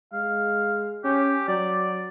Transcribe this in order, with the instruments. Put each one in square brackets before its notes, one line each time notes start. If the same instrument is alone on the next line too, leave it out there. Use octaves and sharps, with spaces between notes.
[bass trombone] G#3 [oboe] F5
[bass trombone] C#4 [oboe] G4
[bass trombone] F#3 [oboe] D5